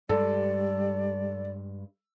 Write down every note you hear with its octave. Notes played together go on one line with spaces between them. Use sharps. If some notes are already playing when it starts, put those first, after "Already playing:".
G2 G3 G#3 A4 D5